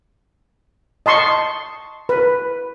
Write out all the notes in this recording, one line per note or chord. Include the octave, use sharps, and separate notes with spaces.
D#5 A5 C6 C#6
B4